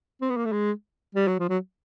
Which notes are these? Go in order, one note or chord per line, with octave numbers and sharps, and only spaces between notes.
C4
B3
A#3
A3
G#3
G3
F#3
F3
F#3